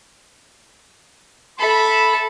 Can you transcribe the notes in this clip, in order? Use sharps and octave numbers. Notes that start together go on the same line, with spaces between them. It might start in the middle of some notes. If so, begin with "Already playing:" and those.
A4 E5 B5